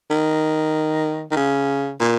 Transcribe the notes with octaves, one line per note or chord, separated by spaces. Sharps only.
D#3
D#3
C#3
A#2